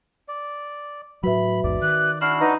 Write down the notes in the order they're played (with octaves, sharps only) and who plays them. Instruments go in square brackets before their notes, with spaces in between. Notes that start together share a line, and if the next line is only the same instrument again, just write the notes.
[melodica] D5
[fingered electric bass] A2 F#3 [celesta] F#4 B4 E5 [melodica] B5
[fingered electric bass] A1 E2 G#2 [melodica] D5
[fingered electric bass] D#3 [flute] F#6
[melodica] D4 E4 F#4 [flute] F6 [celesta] C7 E7 F#7
[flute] D#4 [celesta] B4 F#5 A#5